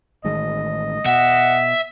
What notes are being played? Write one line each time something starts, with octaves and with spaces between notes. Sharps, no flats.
A1 D#3 G#3 D#5
B2 E5 F#5